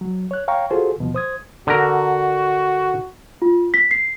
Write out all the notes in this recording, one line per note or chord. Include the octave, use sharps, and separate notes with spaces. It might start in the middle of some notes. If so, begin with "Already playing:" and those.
F#3
C#5 F#6
C#5 F5 G5 A#5 C#6
F4 F#4 G#4 A4 C5
D#2 B2 F3
C5 D#6 G#6
D3 F#4 A#4
F4
B6
C7